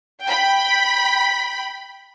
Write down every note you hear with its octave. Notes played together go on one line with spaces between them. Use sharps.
G5 B5